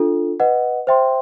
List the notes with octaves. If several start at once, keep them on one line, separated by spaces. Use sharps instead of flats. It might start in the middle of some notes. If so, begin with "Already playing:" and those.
Already playing: D4 F4 A4
B4 D#5 F#5
C5 E5 G5 C6